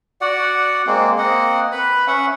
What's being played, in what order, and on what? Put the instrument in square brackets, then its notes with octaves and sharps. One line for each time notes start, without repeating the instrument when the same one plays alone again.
[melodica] F#4 D5 F#5
G#3 A#3 C4
A#3 C4 D#5 F#5
B4 B5
C#4 E5 F#5